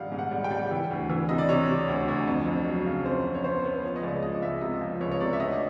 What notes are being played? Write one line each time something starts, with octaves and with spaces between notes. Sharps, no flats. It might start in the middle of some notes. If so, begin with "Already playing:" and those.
Already playing: A#1 G#2 D#3 G3 F5 F#5
G#2
F#5
G3
G5
G3
E3
D2
E3
C3 D#5
D5
C3 C#5
C3
D2
D2
F2
F2
F#3
C#3
F2 C5
F2
C#5
B3 C5
B3
F3 C#5
D#5
C#2 D5
F3 D#5
C#2 E5
C3 D#5
F3
C#2 C#5
C#5
C3 D5
E5
D2 D#5